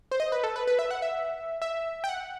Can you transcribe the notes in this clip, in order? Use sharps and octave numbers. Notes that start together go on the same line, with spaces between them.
C5
D#5
B4
A4
B4
B4
E5
F#5
E5
E5
G5
F#5